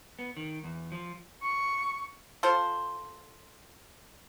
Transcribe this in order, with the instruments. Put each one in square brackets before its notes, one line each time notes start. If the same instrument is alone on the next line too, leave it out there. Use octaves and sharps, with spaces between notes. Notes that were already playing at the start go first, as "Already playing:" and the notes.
[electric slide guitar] B3
D#3
E2
F3
[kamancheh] C#6
[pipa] F4 A4 C5